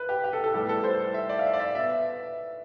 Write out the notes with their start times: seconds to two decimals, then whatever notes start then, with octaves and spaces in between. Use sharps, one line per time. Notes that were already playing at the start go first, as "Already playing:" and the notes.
Already playing: B4
0.09 G4
0.24 G4
0.33 A4
0.44 A4
0.54 A2 G3 B3 G4
0.69 A4
0.84 C5
1.14 E5
1.29 D5
1.39 F5
1.45 E5
1.54 D5
1.59 E5
1.75 B2 B3 E5